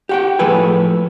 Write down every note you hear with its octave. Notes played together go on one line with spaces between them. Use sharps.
G4 F#5 G5
A2 F3 G#4 A4 B4 G#5